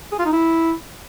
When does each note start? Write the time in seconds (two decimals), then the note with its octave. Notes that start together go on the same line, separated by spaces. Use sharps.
0.12 G#4
0.19 F4
0.26 D#4
0.33 E4